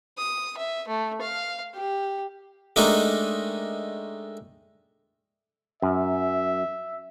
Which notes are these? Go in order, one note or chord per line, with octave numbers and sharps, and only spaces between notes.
D#6
E5
A3
F5
G4
G#3 A3 D4 D#4 G4 A#4
F#2 E5